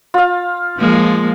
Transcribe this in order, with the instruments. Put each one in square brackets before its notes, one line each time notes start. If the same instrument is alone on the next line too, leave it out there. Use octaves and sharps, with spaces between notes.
[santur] F4 F5
[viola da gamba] F3 G#3 A#3